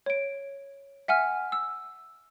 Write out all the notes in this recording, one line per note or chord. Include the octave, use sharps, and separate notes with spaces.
C#5 D7
E5 F#5 G#5 F6
E6